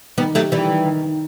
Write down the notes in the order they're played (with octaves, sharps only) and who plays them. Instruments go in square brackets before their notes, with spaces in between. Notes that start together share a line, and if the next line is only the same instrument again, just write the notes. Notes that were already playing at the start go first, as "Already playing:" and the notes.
[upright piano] D#3 [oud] G3 B3
[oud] F#3 A3 [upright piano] G4
[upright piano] D#3 [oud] E3 G3
[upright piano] D#3
D#3
D#3